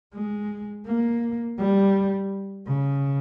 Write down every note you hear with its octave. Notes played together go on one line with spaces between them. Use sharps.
G#3
A#3
G3
C#3